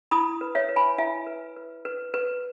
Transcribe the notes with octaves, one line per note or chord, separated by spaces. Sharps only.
E4 B5 D#6
B4
C#5 E5
B4
G#5 B5
E4 E5 G#5
B4
B4
B4
B4